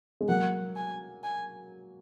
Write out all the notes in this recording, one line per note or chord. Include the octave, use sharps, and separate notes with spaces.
G#3
F#3 A#3 F#5
G#5
G#5